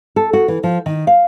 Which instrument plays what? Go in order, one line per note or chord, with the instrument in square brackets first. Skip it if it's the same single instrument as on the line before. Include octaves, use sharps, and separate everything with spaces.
[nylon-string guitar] A4
F#4
E3
F3
D#3
F5